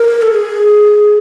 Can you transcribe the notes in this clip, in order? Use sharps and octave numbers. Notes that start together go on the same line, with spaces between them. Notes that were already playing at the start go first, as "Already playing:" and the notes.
Already playing: A#4
A4
G#4